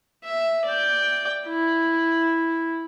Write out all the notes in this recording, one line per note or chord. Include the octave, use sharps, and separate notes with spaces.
E5
D5 G5
E4